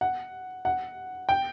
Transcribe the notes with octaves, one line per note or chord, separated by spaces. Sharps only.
F#5
F#5
G5